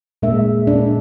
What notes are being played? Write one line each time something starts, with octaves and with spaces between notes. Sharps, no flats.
A#2 G#3 D4 A#4 E5
D4